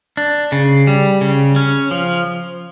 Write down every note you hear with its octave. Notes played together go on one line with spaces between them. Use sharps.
D4
C#3
G3
C#3
C#4
F3